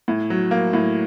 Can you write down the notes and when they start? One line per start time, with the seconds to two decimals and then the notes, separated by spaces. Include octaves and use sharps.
0.08 A2
0.30 F#3
0.51 A#3
0.73 A2